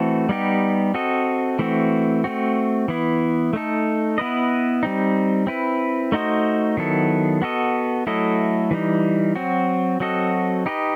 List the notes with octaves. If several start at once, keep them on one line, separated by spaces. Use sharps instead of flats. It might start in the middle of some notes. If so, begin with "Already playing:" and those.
Already playing: E3 A3 C4 F#4 A4
G3 B3 D#4 G4
C4 F#4 A4 D#5
E3 A3 C4 F#4
A3 C4 F#4
E3 B3 E4
A3 D#4 A4
B3 E4 B4 D#5
G3 C4 D#4
C4 E4 B4
A3 D#4 F#4 C5 D#5
D#3 F#3 B3 E4 A4
B3 F#4 A4 D#5
F#3 A3 E4 A4 D#5
E3 G3 D#4
F#3 C4 F#4
F#3 C4 F#4 A4 D#5
D#4 G4 B4 D#5